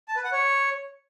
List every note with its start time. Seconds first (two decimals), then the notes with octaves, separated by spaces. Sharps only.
0.08 A5
0.16 B4
0.24 F#5
0.32 C#5